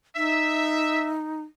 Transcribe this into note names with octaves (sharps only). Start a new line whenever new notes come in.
D#4 E5